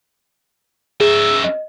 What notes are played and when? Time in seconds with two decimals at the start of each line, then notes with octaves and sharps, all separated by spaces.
1.00 C#4 G#4 E5
1.44 D#5